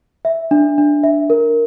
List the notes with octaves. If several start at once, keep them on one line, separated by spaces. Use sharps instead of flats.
E5
D4
D4
E5
A#4